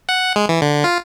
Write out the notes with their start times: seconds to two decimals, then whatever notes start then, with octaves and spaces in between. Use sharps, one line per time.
0.09 F#5
0.36 G#3
0.49 E3
0.62 D3
0.84 F4